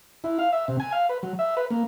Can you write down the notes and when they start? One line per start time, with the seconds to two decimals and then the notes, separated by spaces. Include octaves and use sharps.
0.24 E4
0.39 F5
0.52 E5
0.68 C3
0.80 G#5
0.92 F5
1.09 B4
1.23 F#3
1.39 E5
1.57 B4
1.71 A#3